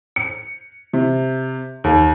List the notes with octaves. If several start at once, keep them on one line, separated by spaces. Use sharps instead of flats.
C#7
C3
D#2